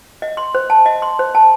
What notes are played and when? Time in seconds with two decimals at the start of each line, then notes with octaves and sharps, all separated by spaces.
0.22 D#5
0.37 C6
0.55 C5
0.70 A5
0.86 D#5
1.02 C6
1.19 C5
1.35 A5